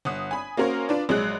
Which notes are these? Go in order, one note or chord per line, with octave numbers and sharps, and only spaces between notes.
G1 F#5 D#6
G#5 B5
A#3 C#4 F#4 A#4 C5 C#5
D4 F4 B4 D5
A#1 F#3 G#3 F#6